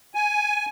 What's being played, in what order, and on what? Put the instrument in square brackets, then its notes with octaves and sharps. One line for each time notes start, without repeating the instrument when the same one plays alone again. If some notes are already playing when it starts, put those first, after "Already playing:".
[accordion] G#5